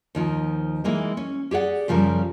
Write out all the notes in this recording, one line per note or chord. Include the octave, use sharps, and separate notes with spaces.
D#2 D#3 F3
E3 G#3 A#3 D#4
C#4
G4 G#4 D5 F#5
F#2 C#3 F3 G3 A#4